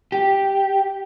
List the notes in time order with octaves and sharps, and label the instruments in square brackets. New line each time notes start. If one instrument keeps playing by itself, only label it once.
[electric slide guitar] G4